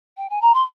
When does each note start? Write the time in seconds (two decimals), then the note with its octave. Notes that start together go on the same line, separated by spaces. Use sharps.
0.17 G5
0.30 G#5
0.41 A#5
0.54 C6